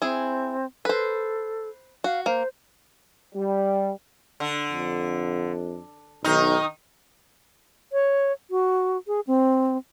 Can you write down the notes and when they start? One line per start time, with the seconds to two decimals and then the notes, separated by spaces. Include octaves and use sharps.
0.02 C4 E4 G#4
0.85 A4 B4 C5
2.04 F#4 F5
2.26 A#3 C5
3.34 G3
4.40 D3
4.72 F2
6.24 B1 D#3 D#4
7.93 C#5
8.51 F#4
9.07 G#4
9.27 C4